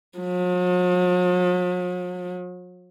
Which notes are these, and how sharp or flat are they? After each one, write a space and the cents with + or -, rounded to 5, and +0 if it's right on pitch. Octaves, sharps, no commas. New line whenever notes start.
F#3 -45